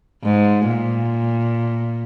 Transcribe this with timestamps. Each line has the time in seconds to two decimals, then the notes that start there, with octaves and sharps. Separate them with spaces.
0.24 G#2
0.67 A#2